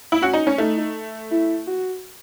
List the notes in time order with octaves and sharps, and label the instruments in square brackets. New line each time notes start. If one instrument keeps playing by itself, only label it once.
[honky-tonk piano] E4
[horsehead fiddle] C#4 [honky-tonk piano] F#4
[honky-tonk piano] D#4
C#4
[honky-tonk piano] A3 [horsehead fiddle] D#4
[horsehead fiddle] E4
F#4